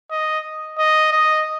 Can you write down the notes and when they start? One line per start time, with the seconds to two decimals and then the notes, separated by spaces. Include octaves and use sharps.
0.11 D#5
0.78 D#5
1.13 D#5